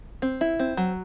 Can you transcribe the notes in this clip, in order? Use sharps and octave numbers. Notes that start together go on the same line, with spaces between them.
C4
E4
C4
F#3